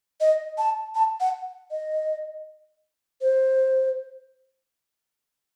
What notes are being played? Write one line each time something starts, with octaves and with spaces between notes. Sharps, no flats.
D#5
A5
A5
F#5
D#5
C5